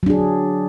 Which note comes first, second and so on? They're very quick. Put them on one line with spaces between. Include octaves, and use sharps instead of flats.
F#3 D4 G#4